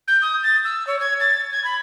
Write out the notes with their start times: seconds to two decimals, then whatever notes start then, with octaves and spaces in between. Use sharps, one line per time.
0.07 G6
0.22 D#6
0.43 A6
0.64 E6
0.87 C#5
1.00 G#6
1.20 A6
1.52 G#6
1.64 B5